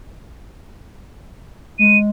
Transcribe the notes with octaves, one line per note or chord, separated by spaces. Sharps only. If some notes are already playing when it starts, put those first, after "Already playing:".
G#3 D#7